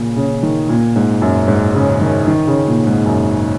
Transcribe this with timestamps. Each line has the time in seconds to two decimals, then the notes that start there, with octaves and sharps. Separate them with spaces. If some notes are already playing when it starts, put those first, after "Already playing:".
Already playing: A#2 C#3
0.16 C#3
0.43 D#3
0.69 A#2
0.96 G#2
1.22 F#2
1.48 G#2
1.75 C#3
2.01 D#3
2.27 D#3
2.47 C#3
2.67 A#2
2.87 G#2
3.06 F#2